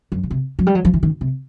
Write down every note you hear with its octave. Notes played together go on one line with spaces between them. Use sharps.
F#2
B2
C3
F#3
G3
F#3
F3
E3
D#3
C3